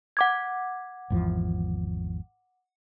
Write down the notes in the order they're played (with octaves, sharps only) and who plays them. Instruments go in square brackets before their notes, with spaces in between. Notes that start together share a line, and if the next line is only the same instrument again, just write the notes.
[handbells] F#5 D6 G#6
[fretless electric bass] G#1 E2 F3